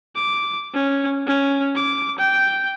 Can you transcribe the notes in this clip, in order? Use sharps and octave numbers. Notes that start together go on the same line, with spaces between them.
D6
C#4
C#4
D6
G5